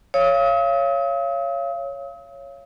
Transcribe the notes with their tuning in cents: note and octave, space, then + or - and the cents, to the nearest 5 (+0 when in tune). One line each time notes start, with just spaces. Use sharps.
C#5 +0 F5 -30 D#6 +45